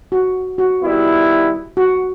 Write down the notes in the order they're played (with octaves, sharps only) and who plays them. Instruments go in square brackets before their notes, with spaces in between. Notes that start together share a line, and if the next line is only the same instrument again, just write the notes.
[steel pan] F#4
F#4
[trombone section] D#3 G3 B3 E4
[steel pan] F#4